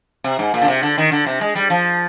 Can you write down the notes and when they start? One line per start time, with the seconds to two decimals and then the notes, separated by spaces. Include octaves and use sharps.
0.24 C3
0.39 G#2
0.54 A#2
0.62 D3
0.68 C3
0.83 D3
0.98 D#3
1.12 D3
1.26 C3
1.41 G#3
1.55 G3
1.70 F3